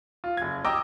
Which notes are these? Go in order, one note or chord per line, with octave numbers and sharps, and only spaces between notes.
F4
F#1 G#6
D#5 G5 A#5 D6 E6